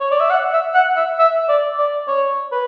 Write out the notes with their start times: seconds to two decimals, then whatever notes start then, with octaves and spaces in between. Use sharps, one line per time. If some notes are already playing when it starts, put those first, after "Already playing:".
0.01 C#5
0.11 D5
0.20 E5
0.30 F#5
0.53 E5
0.74 F#5
0.96 E5
1.19 E5
1.49 D5
1.78 D5
2.08 C#5
2.52 B4